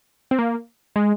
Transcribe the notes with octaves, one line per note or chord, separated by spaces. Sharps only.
C4
A#3
G#3